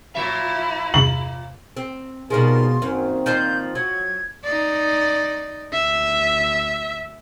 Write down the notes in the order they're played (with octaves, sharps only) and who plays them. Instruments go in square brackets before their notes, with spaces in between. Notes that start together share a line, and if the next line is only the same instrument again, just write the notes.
[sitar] A#2 F3 E5 [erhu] E4
[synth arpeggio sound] E2 G2 C3 [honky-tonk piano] F#7
[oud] C4
[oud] B2 F3 G#3 [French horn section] G3 D#4 A#4 [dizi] C6
[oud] F#2 [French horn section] A#2 D#3 C4
[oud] F3 D#4 C5 [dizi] G6
[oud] F#3 [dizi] G#6
[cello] D#4 D5
[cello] D2 [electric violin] E5